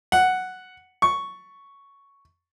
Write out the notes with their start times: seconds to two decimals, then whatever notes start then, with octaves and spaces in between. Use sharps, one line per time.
0.12 F#5
1.02 C#6